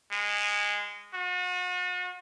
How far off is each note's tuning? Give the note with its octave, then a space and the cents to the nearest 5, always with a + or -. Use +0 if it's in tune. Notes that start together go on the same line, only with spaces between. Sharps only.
G#3 -15
F#4 -40